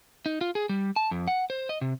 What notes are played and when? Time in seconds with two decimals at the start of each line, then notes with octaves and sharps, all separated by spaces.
0.26 D#4
0.41 F4
0.55 G#4
0.69 G3
0.96 A5
1.11 F2
1.27 F#5
1.50 C5
1.69 D#5
1.81 C3